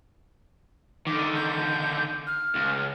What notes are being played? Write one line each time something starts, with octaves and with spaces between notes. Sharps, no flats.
D3 D#3 D6
G6
F6
C#2